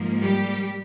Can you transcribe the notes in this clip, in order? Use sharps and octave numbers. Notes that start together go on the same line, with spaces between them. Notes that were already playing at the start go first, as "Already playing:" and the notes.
Already playing: G#2 F3 A#3
G3 G4